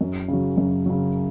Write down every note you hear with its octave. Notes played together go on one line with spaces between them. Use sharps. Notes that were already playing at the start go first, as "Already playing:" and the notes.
F#2
C#3 F#3
F#2
C#3 F#3